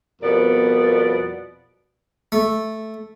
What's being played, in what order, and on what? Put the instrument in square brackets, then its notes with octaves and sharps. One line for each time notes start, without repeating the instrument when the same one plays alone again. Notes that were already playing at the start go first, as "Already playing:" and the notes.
[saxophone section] F2 B2 G3 B3 A#4 D5
[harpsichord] A3